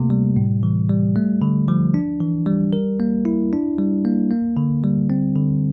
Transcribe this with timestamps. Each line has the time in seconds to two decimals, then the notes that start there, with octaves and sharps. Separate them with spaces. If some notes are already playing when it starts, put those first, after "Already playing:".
Already playing: C3 A3 A#3
0.10 G3
0.36 A2
0.63 E3
0.89 G3
1.16 A3
1.42 D3
1.68 F3
1.94 D4
2.20 E3
2.46 G3
2.73 A#4
3.00 A#3
3.25 E4
3.53 D4
3.79 G3
4.05 A#3
4.31 A#3
4.57 D3
4.84 G3
5.10 C4
5.36 D3